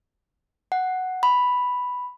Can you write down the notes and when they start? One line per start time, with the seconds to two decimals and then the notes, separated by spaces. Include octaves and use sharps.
0.72 F#5
1.23 B5